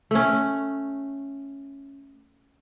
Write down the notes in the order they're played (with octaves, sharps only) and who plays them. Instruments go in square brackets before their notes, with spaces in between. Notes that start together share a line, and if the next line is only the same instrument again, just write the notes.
[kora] A3 C#4